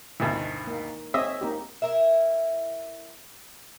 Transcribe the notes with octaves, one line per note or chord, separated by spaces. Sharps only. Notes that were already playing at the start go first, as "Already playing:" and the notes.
D2 G2 B2 D#4 E4 A#4
A#3 D#4
C4 G#4 C#5 D#5 E5
A#3 D#4 G4
E4 A#4 E5